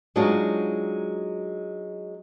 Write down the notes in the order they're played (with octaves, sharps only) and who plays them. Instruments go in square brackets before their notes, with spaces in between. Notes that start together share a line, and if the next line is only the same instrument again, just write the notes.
[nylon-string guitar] F#3 G#3 D4 D#4 F4 F#4